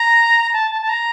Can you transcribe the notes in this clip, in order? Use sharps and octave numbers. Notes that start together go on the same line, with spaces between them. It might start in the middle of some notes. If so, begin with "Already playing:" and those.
Already playing: A#5
A5
A5
A5
A#5